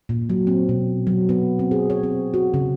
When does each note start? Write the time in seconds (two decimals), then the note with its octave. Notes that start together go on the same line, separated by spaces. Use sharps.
0.09 A#2
0.30 F#3
0.47 C4
0.69 B2
1.07 F#3
1.29 B3
1.59 C4
1.71 G#4
1.90 C#5
2.03 C4
2.34 F#4
2.54 C#3